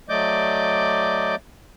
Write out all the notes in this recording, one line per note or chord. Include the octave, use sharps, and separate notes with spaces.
F#3 A3 D5 D#5 D6 G6